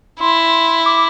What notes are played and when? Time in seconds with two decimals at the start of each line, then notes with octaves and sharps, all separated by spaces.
0.20 E4 C6
0.86 D6